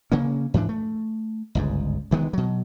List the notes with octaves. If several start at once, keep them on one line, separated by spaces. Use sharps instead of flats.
C#3 A#3 C#4
G#2 E3 F3 D4
A3
G1 C#2 G#2
D2 D#3 G#3 B3
B2 F#3